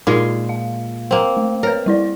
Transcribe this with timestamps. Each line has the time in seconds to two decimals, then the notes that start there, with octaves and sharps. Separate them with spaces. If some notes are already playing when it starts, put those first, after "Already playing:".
0.07 A#2 G#3 D#4 F4
0.49 F5
1.11 A#3 C4
1.37 A3
1.63 A#4 B4 C#5
1.86 G3 E4 D5